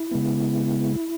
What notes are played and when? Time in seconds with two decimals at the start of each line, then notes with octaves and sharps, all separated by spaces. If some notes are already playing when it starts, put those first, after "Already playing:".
Already playing: E4
0.11 C#3 G#3 B3